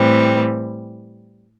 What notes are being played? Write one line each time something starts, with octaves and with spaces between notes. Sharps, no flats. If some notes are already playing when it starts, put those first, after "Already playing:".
Already playing: A2 E3 G3 C4